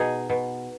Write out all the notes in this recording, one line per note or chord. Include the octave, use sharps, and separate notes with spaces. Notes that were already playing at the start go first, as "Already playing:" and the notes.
Already playing: B2 D#4 G#4
B2